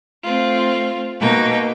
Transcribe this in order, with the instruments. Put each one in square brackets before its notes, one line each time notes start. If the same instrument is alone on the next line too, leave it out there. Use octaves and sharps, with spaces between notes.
[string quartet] A3 C4 F4
B2 A#3 D#4 G5